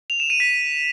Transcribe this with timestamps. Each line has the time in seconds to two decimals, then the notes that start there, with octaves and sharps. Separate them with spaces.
0.10 F7
0.20 E7
0.30 D#7
0.40 B6